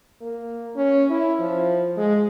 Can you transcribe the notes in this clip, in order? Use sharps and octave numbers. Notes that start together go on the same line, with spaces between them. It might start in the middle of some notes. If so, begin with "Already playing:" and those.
A#3
C#4
E4
F3
G#3